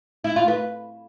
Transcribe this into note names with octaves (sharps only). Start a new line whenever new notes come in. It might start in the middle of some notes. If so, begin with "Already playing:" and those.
E4
F4
B4